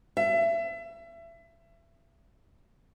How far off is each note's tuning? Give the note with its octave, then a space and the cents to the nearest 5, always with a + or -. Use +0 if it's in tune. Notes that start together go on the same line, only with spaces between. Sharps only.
E5 +30